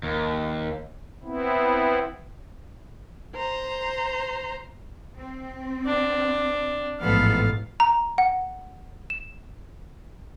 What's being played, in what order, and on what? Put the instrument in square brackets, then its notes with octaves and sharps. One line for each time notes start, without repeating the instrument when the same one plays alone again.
[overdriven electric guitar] D#2
[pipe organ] B3 C4 E4
[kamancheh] C5 A#5
[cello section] C4
[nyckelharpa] D4
[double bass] A1 G#2 [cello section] F3 B3 A4 [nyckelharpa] F5
[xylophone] A#5
F#5
E7